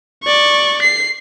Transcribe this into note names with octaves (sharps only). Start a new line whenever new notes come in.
D5 C#6
C7